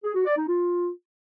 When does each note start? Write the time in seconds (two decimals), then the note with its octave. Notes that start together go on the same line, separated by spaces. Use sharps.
0.04 G#4
0.15 F#4
0.26 D5
0.37 D#4
0.48 F4